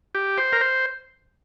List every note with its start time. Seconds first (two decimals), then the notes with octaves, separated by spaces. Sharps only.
0.15 G4
0.38 C5
0.53 A#4
0.61 C5